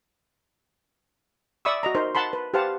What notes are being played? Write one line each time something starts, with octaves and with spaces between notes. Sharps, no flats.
D5 E5 B5 C#6 D#6 E6
F#4 D#5 A#5
D#4 A#4 C5
F#5 A5 B5 C6
B4
G4 B4 C5 F5 F#5 A5